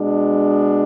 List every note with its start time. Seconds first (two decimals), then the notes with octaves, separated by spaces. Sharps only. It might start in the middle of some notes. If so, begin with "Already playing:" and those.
Already playing: B2 G#3 D4